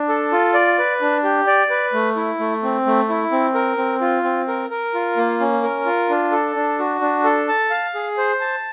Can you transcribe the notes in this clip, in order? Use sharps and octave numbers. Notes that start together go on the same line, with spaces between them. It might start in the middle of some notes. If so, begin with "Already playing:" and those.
Already playing: D4
A4
F4
D5
B4
D4
G4
D5
B4
A3
E4
A3
C4
A3
E4
C4
A#4
C4
F4
C4
A#4
A#4
F4
A#3
C#4
A#4
F4
D4
A4
D4
F#4
D4
A4
A5
F5
G#4
C5
A5